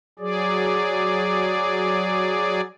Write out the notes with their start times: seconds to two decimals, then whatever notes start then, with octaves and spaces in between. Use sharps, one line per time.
0.19 F#3 G#4 D5